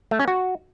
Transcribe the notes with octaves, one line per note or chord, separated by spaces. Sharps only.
A3
C#4
F#4